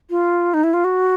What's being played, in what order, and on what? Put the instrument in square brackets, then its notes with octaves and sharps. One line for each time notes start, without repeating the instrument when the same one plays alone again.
[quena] F4
D#4
E4
F4
F#4